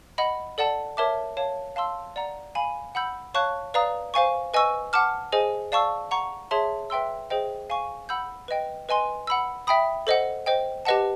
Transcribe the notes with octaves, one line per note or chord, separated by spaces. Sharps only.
D#5 F#5 B5
A4 D5 F#5 A5
A#4 C#5 E5 A5 D6
C#5 F5 A5
F5 A5 C6 E6
D5 F#5 A#5
F5 G#5 B5
F#5 B5 E6 G6
C#5 F5 A5 C#6 F#6
B4 D5 F5 A#5 D#6
C5 F5 G#5 C#6
B4 D#5 G#5 C#6 E6
F#5 A5 D6 F6
G#4 C5 D#5 G#5
D5 F5 A5 C#6 E6
F#5 A#5 C#6
G#4 C#5 E5 A5 C6
B4 E5 G5 C6 E6
G#4 C5 D#5 G5
F5 G#5 C#6
F#5 B5 E6 G6
B4 D#5 G5
B4 D#5 G#5 C6
F#5 B5 E6
E5 G5 B5 D#6
A4 C5 D#5 F#5
C5 D#5 G5
G4 B4 D#5 F#5 A5